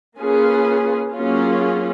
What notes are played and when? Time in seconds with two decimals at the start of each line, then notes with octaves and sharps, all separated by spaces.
0.17 A#3 C#4 F4 G#4 B4
1.12 F#3 A#3 C#4 F4 G#4